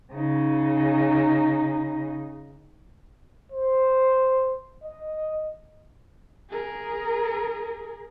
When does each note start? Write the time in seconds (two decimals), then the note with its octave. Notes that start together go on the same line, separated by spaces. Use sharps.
0.13 C#3 D#4
3.52 C5
4.84 D#5
6.50 G#4 A#4